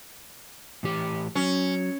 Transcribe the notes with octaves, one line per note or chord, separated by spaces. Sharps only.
A2 E3 G4
F#3 C#4